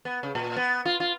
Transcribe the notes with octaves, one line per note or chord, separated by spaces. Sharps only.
B3
C#3
A#2
B3
F4
F4